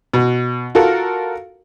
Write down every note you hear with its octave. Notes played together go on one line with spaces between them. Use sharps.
B2
F4 F#4 A4 A#4